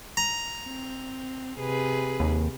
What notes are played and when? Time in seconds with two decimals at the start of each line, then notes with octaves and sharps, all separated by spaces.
0.17 A#5
0.65 C4
1.59 C3 G#4 B4
2.20 D#2